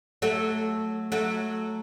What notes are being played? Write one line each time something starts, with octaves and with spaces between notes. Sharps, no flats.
F#3 A3
F#3 A3